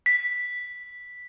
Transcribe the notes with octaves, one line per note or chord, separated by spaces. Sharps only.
B6